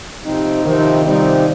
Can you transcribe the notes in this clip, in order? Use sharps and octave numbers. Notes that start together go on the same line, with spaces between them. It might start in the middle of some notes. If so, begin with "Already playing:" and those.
C3 F3 C4 D#4
C3 D#3 F3 C4 D#4
C3 F3 G3 C4 D#4